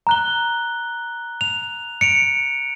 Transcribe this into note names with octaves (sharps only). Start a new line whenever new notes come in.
A#5 F#6 G7
F7
C#7 D7 F7